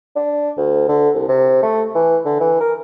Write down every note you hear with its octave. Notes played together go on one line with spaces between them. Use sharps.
D4
D2
D3
C2
C3
A3
E3
D3
E3
A#4